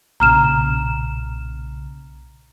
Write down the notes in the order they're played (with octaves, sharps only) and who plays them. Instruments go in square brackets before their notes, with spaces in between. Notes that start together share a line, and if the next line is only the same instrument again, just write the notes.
[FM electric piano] B1 A#2 C#3 [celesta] A#5 F6 E7